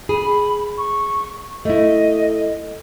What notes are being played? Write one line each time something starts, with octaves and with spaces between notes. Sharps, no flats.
G#4 B5
C#6
A3 E4 D#5